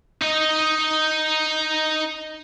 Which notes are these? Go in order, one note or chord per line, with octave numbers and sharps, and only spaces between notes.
D#4 D#5